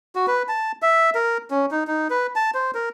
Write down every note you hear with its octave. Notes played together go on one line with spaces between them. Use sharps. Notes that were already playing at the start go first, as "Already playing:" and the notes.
F#4
B4
A5
E5
A#4
C#4
D#4
D#4
B4
A5
C5
A#4